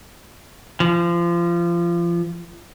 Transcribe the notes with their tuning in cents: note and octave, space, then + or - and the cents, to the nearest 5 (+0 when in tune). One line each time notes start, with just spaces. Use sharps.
F3 -30